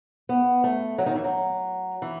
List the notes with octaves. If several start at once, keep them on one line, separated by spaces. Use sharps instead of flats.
B3
A3
F#3
D#3
E3
F#3
E3